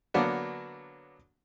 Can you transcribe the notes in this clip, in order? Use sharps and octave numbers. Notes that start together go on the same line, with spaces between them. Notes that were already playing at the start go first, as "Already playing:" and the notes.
D3 F#3 A#3 B3 D4